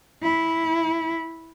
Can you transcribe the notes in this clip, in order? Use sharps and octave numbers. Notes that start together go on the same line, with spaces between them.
E4